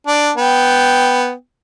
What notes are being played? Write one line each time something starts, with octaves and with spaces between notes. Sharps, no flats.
D4
B3 G5